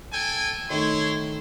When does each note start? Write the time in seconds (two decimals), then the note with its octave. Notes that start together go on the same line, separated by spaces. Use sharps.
0.12 A4 G5 G#5
0.70 D#3 A3 E4 C#5 C6